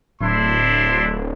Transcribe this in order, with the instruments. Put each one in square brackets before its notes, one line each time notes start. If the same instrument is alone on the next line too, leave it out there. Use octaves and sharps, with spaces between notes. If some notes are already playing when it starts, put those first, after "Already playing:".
[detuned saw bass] D1 [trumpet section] D4 E4 C6